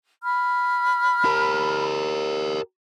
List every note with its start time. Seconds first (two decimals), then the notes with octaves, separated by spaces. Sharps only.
0.23 B5 F6
1.25 G4 A#4